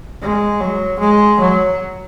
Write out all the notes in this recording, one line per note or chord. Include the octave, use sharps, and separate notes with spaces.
G#3
F#3
G#3
F#3